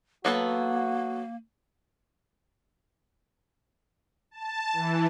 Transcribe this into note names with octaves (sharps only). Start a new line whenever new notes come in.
F#3 A#3 B3 F#4 A4
A5
E3